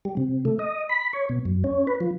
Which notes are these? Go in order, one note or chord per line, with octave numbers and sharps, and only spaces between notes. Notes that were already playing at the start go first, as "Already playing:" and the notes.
G3
C3
A3
D#5
B5
C#5
B2
F#2
C#4
B4
F3